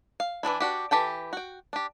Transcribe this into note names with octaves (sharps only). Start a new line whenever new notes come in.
F5
E3 F3 D4 E4
D4 F#4 G4
E3 G4 A4 G5
F#4 G5
D4 G4